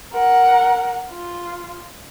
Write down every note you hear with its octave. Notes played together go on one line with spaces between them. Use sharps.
A#4 F#5
F4